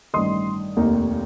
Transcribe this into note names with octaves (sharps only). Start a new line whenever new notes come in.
A1 G2 D#3 C6 D#6
F1 D#2 D#3 A#3 D#4